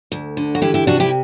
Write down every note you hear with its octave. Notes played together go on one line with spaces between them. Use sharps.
D2
D3
F#4
E2 E4 G4
E4 G4
C3 D4 F#4
E4 G4